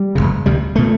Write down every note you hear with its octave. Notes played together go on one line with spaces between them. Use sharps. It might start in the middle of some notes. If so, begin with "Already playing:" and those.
Already playing: G3
E1 D#2 C#3
D2 C3 G3
B2 A3